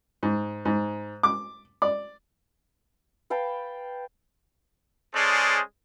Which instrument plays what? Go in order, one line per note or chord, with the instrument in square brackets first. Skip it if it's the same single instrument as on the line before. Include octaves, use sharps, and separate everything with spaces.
[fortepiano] G#2
G#2
D6
D5
[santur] B4 F5 G5 A5
[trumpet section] G#3 C#4 G#4 A4 C5 D5